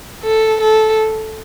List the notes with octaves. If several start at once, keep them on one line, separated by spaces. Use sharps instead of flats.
A4
A4